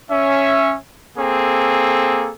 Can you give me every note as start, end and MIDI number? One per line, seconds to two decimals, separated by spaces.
0.10 0.76 61
0.10 0.76 76
1.18 2.31 58
1.18 2.31 60
1.18 2.31 68
1.18 2.31 69